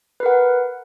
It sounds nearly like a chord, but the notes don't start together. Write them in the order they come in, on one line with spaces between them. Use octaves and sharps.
B4 A#4 F#5